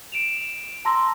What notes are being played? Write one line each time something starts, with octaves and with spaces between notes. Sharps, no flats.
D7 E7 F7
A5 A#5 C6 E6 A#6